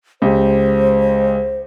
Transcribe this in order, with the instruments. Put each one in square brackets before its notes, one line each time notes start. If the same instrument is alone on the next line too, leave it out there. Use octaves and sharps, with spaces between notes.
[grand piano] C#2 G4 [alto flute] C5